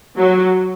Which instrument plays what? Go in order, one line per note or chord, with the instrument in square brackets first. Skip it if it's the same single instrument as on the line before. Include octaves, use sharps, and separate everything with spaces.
[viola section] F#3